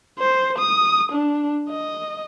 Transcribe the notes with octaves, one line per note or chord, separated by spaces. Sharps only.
C5
D#6
D4
D#5